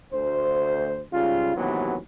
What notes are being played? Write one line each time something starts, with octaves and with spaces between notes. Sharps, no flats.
D2 C5
G#2 C#3 G3 F4
A1 D#2 C3 E3 F#3 B3